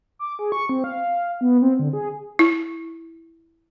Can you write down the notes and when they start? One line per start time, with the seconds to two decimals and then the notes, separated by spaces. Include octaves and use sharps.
0.19 D6
0.39 G#4
0.52 C#6
0.69 C4
0.84 F5
1.41 B3
1.62 C4
1.79 D3
1.93 G#4
2.39 E4